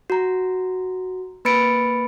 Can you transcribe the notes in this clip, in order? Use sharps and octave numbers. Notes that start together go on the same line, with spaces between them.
F#4 A#5
A#3 B4 B5 A6 C#7 D7